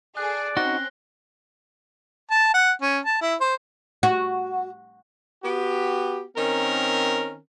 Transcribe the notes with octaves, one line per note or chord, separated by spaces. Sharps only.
G#4 A4 D5 F#6
C4 C#4 D#4 F#4 F#6 A#6 G7
A5
F#5
C#4
A5
E4
C5
F#4
B3 F#4 G4
D#3 C4 C#4 A#4